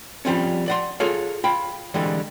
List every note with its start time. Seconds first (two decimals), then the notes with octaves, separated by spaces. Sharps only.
0.25 F3 G3 C4 C#4
0.68 D5 F#5 C6
1.00 F4 G#4 A4 C#5 F5
1.44 F4 G5 B5
1.94 D3 E3 G3 G#3